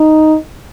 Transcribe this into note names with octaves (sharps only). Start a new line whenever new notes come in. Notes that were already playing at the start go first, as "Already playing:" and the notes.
Already playing: D#4